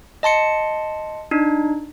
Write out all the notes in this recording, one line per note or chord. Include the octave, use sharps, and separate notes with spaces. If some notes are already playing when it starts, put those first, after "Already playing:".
D#5 A5 C6 C#7
D4 D#4